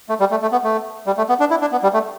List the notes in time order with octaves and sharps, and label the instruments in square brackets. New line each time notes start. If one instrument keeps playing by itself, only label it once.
[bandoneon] A3
G3
A3
A3
B3
A3
G3
A3
B3
D4
E4
D4
B3
G3
A3